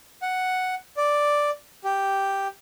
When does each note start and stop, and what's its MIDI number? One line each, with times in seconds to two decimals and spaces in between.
0.22 0.75 78
0.97 1.50 74
1.84 2.47 67